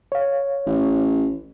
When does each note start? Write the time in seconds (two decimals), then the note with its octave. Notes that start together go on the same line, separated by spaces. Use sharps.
0.12 C#5 F5
0.66 A1